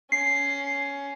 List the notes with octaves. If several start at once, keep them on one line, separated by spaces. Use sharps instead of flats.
C#4 C7